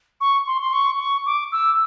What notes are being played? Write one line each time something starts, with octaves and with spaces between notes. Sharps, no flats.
C#6
C6
C6
C#6
C#6
D6
E6